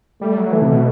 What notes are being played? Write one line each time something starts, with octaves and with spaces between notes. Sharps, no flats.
G3 A3
F#3
E3 A3
C3
B2